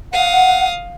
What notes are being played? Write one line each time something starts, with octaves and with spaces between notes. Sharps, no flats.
F5 F#5 D#6